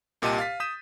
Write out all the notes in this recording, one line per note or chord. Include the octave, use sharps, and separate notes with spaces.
C2 A#2 G4 D#5 A5 D#7
F5 A6 B6
D#6 G6 B6 D#7 E7